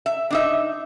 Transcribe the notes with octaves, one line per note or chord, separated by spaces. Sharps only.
E5
D4 D#4 E5